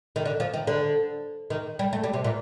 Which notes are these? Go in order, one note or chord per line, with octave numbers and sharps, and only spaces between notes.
D#3
D3
F3
D#3
D3
D#3
G3
A3
G3
C3
A#2